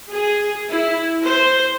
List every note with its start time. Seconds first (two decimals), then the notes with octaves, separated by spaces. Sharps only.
0.11 G#4
0.69 E4
1.23 C5